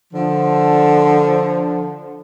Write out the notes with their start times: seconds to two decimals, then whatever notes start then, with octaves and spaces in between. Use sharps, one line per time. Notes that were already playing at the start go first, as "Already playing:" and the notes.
0.13 D3 F3